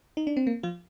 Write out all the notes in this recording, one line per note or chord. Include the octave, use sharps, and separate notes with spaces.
D#4
D4
C4
A#3
F3 F4